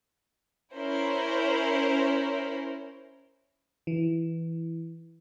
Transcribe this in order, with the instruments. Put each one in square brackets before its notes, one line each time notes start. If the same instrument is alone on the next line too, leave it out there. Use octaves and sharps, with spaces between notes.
[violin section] C#4 E4 A#4 C5 C#5
[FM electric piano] E3